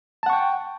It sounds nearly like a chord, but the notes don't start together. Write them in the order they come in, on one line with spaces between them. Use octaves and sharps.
A5 F#5 C#6 G5